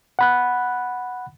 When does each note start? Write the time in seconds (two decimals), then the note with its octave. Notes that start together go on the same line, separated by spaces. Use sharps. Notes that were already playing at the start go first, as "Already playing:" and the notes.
0.19 F#5 B5 F#6